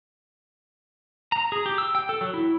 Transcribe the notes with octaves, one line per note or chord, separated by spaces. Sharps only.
A#5
G#4
G4
E6
G5
A4
F#3
E4